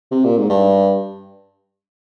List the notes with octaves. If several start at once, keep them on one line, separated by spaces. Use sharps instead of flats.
C3
A#2
G#2
G2